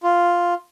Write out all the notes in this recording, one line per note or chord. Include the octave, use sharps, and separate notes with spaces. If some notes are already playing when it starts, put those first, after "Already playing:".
F4